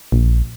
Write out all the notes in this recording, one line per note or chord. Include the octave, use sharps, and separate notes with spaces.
A#1